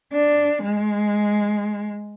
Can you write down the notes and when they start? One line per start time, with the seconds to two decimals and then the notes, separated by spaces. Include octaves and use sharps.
0.13 D4
0.64 G#3